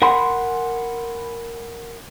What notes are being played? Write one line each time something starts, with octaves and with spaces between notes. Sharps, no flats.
A#4 F#5 G#5 B5 C6